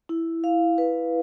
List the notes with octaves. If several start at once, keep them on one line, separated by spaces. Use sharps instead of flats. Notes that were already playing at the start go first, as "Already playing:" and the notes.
E4
F5
B4